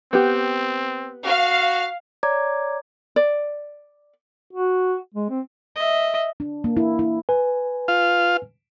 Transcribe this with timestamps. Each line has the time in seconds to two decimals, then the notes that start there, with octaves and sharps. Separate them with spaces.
0.13 B3 C4 G4
1.25 F#4 F5
2.23 C#5 D5 A#5 D6 G#6
3.16 D5
4.53 F#4
5.14 G#3
5.30 C4
5.76 D#5 E5
6.40 D4
6.64 A#3
6.77 E4
6.99 E4
7.29 B4 G#5
7.88 F4 F5